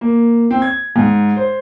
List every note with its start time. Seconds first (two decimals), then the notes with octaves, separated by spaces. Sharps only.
0.01 A#3
0.51 C4
0.62 G#6
0.96 G#2
1.36 C5